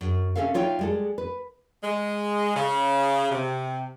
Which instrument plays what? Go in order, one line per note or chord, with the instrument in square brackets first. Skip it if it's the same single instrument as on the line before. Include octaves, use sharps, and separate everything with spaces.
[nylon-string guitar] F#2
C3 F3 C#4 A4 E5 F5
D#4 F4 C#5 E5 G5
G3 G#3 A4
B4
[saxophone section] G#3
C#3
C3